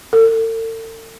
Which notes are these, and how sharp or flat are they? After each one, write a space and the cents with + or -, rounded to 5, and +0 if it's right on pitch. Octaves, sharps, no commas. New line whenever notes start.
A4 +40